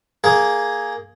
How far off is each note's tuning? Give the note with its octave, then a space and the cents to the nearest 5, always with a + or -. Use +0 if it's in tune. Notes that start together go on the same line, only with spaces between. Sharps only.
A#3 +0 G#4 +0